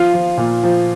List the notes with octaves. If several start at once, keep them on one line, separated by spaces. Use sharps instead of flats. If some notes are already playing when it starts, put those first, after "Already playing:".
Already playing: F3 F4
F3
A#2
F3